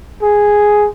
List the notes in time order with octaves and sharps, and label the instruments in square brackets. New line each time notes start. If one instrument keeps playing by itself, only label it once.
[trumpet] G#4